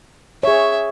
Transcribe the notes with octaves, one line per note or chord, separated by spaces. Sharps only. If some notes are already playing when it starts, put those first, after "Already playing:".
G#4 C#5 E5